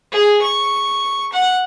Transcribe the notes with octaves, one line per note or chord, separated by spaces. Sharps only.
G#4
C#6
F#5